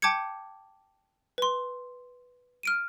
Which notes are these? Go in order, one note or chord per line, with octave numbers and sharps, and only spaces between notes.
G5 A5 D6 G6 G#6 C#7
B4 C6
F6 D7 D#7